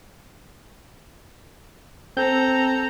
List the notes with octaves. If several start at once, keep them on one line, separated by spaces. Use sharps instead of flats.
C4 A4 A#5 G6